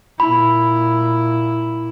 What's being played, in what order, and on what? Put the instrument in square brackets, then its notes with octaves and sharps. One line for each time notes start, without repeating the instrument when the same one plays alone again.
[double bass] A#2 E4 [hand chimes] B5